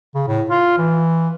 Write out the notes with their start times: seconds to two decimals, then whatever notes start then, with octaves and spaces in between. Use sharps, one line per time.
0.15 C#3
0.28 A2
0.50 F4
0.78 E3